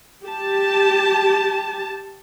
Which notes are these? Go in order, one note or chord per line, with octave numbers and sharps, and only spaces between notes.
G4 A5